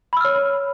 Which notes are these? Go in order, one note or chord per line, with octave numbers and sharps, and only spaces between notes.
C#5 B5 E6 F6